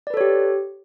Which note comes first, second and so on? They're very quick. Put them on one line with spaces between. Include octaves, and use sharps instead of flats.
D5 B4 A4 C#5 G4